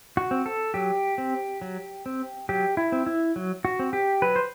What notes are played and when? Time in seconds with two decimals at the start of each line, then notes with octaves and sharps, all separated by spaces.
0.17 F#4
0.31 C4
0.46 A4
0.74 F#3 G4
1.18 C4
1.61 F#3
2.06 C4
2.49 F#3 G4
2.77 E4
2.92 C4
3.06 E4
3.36 F#3
3.65 F#4
3.79 C4
3.93 G4
4.22 F#3 B4
4.36 C5